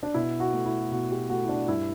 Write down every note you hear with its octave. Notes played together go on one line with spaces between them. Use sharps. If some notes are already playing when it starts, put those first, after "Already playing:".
D4
B2 E4
F#4
A3
E4
B2 F#4
G4
A3 F#4
E4
D4
G2 E4